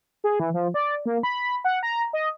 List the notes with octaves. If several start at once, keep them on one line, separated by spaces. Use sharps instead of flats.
G#4
E3
F3
D5
A#3
B5
F#5
A#5
D#5